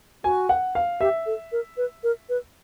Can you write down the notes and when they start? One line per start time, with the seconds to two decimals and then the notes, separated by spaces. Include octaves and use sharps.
0.24 F#4 G#5
0.49 F#5
0.75 F5
1.01 G4 E5
1.26 A4
1.52 A#4
1.77 B4
2.04 A#4
2.29 B4